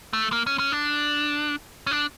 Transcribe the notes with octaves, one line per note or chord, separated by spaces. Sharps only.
A3
A#3
C#4
C#4
D4
C#4
D4